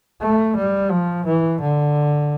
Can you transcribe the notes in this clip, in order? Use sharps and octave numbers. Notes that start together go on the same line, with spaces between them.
A3
G3
F3
E3
D3